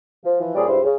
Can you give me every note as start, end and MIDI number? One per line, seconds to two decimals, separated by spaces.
0.24 0.36 53
0.40 0.51 52
0.40 0.51 53
0.55 0.64 46
0.55 0.64 55
0.55 0.64 61
0.55 0.64 68
0.55 0.64 72
0.55 0.64 74
0.67 0.79 37
0.67 0.79 43
0.67 0.79 64
0.67 0.79 67
0.67 0.79 72
0.84 0.95 49